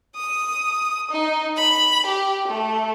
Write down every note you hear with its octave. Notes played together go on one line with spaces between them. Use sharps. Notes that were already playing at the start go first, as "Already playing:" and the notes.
D#6
D#4
B5
G4
A3